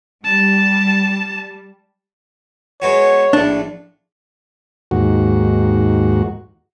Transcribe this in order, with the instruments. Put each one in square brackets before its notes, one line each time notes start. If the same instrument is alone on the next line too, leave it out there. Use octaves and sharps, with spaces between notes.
[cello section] G3 [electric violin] A5
[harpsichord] G#3 B3 F#4 [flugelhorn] C#5
[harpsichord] A#1 A2 [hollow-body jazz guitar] D4
[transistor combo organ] D#2 G#2 F#4